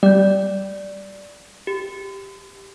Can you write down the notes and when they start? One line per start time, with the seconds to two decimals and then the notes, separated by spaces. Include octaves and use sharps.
0.03 G3 D5 G6
1.67 G4